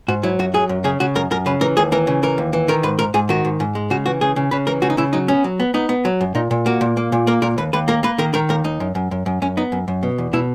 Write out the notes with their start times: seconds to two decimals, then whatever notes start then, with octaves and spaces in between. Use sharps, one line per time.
0.08 G#2 F#4
0.23 F#3 E4
0.39 F#2 F#4
0.54 F#3 G#4
0.69 F#2
0.84 C#3 G#4
1.00 C#3 F#4
1.15 F#2 A#4
1.31 F#2 A#4
1.46 C#3 B4
1.61 E3 A#4
1.77 D#2 G#4
1.92 E3 A#4
2.07 C#3
2.23 E3 A#4
2.38 D#2
2.53 E3
2.68 D#3 A#4
2.83 G#2 B4
2.99 G#2 A#4
3.14 G#2 G#4
3.29 D#3 F#4
3.45 G#2
3.60 G#2
3.75 G#3
3.90 C#3 F#4
4.06 E3 F#4
4.21 C#3 G#4
4.36 C#3
4.51 C#3 B4
4.67 E3 A#4
4.82 C#3 F#4
4.90 D#4
4.97 C#3 E4
5.13 F#3 D#4
5.28 B3 C#4
5.44 F#3
5.60 B3
5.74 B3 D#4
5.89 B3
6.05 F#3
6.21 F#2
6.35 A#2 D#4
6.51 A#2
6.66 A#3 F#4
6.81 A#2
6.97 A#3
7.12 A#2
7.27 A#3 A#4
7.42 A#2 A#4
7.58 D#2 B4
7.73 D#2 B4
7.88 A#3 A#4
8.03 A#3 B4
8.18 D#3 A#4
8.34 D#3 A#4
8.49 D#2 A#4
8.64 D#2 D#4
8.80 F#2
8.95 F#2
9.11 F#2
9.26 F#2
9.42 F#2 C#4
9.57 B3 D#4
9.72 F#2
9.88 F#2
10.03 B2
10.18 E2
10.33 B2 E4